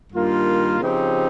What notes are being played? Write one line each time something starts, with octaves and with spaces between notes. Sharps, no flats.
G2 D#3 A#3 F4
C#3 F3 C4 D#4 G4